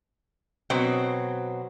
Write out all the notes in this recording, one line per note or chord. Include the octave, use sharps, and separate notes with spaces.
B2 F#3 C4